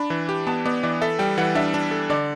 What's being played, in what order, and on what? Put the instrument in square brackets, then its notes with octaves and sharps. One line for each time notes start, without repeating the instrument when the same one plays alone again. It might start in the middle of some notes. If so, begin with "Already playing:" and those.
Already playing: [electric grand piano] D4 [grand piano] B5
[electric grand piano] E3
G4
[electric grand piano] B3 [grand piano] A5
[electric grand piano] B3 [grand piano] D5
[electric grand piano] E3 [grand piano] D5
[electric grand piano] A4 [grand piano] E5
[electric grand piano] G3 [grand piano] G5
[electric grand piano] E3 [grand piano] F#5
[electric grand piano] D4 [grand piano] E5
[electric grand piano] D4
A4
[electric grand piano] D3 [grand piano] D5